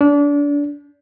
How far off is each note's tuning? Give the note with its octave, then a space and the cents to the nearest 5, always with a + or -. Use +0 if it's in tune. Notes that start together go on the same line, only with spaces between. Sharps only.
D4 -30